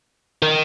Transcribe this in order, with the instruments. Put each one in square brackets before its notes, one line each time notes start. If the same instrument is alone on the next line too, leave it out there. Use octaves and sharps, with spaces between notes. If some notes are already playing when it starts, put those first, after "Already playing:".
[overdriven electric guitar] D#3